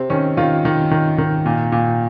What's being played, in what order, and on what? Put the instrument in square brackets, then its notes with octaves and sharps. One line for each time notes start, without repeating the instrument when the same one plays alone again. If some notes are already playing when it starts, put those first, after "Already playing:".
Already playing: [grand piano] C3 C4
D#3 C#4
D#3 F4
D#3
D#3
D#3
A#2
A#2